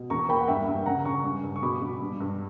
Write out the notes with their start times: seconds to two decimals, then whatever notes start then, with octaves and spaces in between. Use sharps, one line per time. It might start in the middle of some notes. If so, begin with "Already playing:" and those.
Already playing: B2
0.10 E2 A#5 C#6
0.29 A#3 G5 B5
0.41 F#5
0.48 G2 E5 G5
0.67 G2
0.86 C#3 F#5 A#5
1.05 C#3 A#5 C#6
1.24 G2
1.43 G2
1.56 C#6
1.63 B2 B5 D6
1.81 B2
2.01 G2
2.20 G2